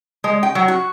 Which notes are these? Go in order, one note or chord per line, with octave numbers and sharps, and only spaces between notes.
G#3
G5
F#3
F#4